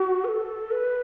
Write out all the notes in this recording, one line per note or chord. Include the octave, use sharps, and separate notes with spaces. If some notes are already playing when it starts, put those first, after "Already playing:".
Already playing: F#4
B4
A4
B4